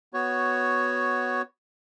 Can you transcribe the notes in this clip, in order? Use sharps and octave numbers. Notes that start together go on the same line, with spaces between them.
B3 F#4 C#5